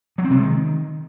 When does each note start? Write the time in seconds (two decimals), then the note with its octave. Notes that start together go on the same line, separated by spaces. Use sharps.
0.18 F#3
0.24 C4
0.31 C3
0.37 G#3
0.43 D#3